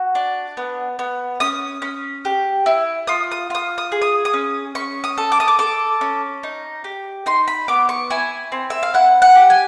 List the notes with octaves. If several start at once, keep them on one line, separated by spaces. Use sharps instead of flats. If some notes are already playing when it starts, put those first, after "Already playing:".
Already playing: F#4
D4
B3
B3
C#4 D#6
C#4
G4
E4
F4 D#6
D#6
F4 D#6
D#6
G#4
D#6
D#6
C#4
C#4 C#6
D#6
A4
D6
D#6
D6
A4 D6
C#4
D#4
G4
D#4 C6
B5
B3 D6
C#6
E4 G#5
C4
E5
F5
E4 F#5
F#5
G4
G#5